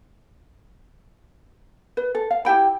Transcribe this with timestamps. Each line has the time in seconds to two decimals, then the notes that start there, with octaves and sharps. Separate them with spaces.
1.97 B4
2.15 A4
2.31 F5
2.45 E4 G4 G5 B5